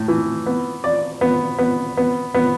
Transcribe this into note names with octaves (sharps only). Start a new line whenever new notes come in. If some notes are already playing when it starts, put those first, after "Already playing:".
Already playing: A2
E3
B3
D5
B3
B3
B3
B3